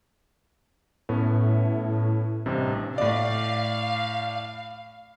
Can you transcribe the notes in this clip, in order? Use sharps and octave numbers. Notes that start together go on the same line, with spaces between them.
A2 B3 C#4
A1 G2 C3
A2 D5 F5